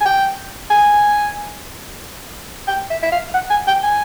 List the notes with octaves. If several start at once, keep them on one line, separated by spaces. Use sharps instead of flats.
G#5
G5
G#5
G5
E5
E5
F5
F#5
G#5
G5
G#5